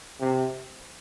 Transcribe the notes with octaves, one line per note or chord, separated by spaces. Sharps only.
C3